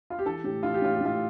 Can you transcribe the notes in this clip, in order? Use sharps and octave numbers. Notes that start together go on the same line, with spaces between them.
F4
G4
E3 A4
A2 G4
E3 F4
G4
A2 F4
G4
A2 F4